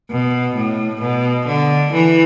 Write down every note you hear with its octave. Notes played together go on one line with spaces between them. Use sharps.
B2
A2
B2
D3
E3